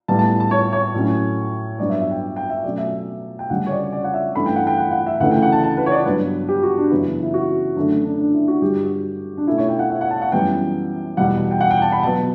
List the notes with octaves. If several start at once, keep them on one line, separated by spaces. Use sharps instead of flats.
A2 G3 B3 A5
A5
A5
C#5
C#5
A2 F#3 C#4
G2 F#3 B3 D5
E5
E5
G5
G5
E5
B2 F#3 A3 C#4 D5
E5
G5
D2 C#3 G3 C#4 F#5
C#5
D5
D5
F#5
E5
G2 E3 A3 C#4 B5
G5
F#5
G5
F#5
F#5
E5
D2 C#3 E3 A3 F#5
G5
F#5
A5
A5
B4
C#5
D5
G2 F#3 B3 B4
G4
F#4
D4
F#2 C#3 E3 B3
E4
F#4
F#2 D3 A3 D4
D4
D4
E4
F#4
G2 D3 G3 G4
F#4
D4
B2 A3 C#4 E4
C#5
G5
F#5
E5
F#5
A5
F#5
F#2 E3 G3 B3 G5
E2 B2 G3 F#5
G5
F#5
G5
A5
B5
B2 F#3 B3 A5